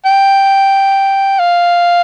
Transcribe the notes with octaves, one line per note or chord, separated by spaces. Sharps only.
G5
F5